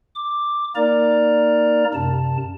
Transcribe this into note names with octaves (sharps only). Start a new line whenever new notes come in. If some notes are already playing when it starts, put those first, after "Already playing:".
D6
A#3 D#4 A#4 D5 A#5
F#2 C3 A5